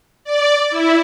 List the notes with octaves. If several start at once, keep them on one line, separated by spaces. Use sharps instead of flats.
D5
E4